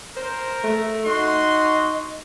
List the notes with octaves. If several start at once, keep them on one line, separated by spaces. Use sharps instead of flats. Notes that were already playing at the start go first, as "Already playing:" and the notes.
A#4 C5
A3
D#4 F#4 C6